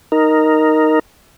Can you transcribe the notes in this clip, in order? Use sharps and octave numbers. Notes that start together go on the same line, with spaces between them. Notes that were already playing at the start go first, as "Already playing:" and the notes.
D#4 A#4